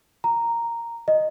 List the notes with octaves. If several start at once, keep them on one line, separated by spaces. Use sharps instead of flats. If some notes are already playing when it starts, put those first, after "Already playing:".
A#5
D#5